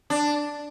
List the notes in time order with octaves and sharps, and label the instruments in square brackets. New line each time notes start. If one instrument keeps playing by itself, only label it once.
[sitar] D4